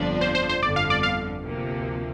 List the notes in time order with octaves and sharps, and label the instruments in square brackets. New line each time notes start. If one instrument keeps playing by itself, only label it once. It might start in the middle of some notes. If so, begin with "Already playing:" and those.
Already playing: [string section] G1 F2 F3 D4
[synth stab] C5
C5
C5
[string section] G1 F2 D3 [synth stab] D5
[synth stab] F5
D5
F5
[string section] D2 C3 F3 A#3